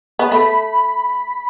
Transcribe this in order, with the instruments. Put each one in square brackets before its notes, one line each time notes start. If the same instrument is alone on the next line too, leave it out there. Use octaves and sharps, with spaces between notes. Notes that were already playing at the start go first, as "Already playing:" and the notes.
[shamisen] B3
[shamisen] A3 [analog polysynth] B5